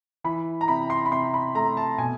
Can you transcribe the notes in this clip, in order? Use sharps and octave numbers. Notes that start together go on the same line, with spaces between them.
E3 B5
A#5
C3 B5
C6
B5
C3 C6
B5
A3 A#5
A5
B2 G#5